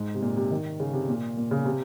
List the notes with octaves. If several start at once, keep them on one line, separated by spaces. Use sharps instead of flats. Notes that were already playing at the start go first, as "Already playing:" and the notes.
Already playing: G#2
C3
A#2
C3
D#3
C#3
C3
A#2
A#2
C#3
C3